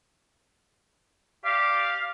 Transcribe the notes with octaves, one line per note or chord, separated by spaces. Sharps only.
G4 D5 F5